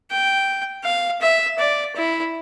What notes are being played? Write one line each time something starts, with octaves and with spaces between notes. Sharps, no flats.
G5
F5
E5
D5
E4